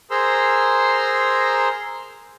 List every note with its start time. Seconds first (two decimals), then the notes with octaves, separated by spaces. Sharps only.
0.11 G#4 A#4 C5 A#5 C6 E6